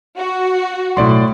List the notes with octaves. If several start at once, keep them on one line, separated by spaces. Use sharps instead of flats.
F#4
B1 A2 D5 C6